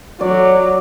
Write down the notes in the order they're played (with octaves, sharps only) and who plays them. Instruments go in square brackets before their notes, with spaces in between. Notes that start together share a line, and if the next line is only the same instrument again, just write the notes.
[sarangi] F#3 [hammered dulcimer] D5